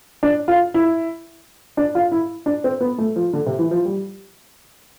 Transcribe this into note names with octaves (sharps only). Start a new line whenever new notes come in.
D4
F4
E4
D4
F4
E4
D4
C4
B3
A3
F3
D3
C3
E3
F3
G3